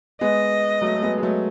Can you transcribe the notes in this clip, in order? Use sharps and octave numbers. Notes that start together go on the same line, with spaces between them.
G#3 B3 D#5
F#3 A3
A3
G#3 B3
G#3
F#3 A3